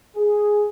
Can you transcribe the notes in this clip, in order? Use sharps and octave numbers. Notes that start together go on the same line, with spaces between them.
G#4